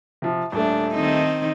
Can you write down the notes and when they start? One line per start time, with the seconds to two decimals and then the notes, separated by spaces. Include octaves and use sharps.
0.22 C3 F3
0.52 D#1 A3 D4
0.95 D#3 C4 D#4